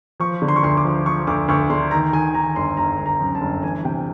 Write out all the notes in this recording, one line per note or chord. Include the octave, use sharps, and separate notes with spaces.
F3 C#6
D3
C6
C#6
D2 C6
D6
F3
F3 C#6
D2 D6
D2 C#6
D3 C6
D#3 A#5
D#3 G#5
D#3 A#5
G1 C6
G1 A#5
G1
A#5
F#2
A5
G1
E3 G#5
C3 G5